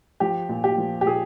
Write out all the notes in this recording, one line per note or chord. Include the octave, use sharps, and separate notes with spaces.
F3 G4
A#2
G4
F3
G4
A#2 G#4